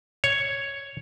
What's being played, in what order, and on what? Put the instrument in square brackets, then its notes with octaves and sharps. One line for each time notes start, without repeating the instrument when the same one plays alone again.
[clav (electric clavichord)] C#5